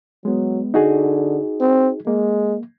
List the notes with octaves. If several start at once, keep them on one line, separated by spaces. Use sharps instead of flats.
F#3 G#3 B3
D3 D#4 F#4 G#4
C4
G#3 A#3